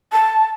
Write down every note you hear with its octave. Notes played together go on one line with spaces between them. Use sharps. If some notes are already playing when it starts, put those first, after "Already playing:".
A5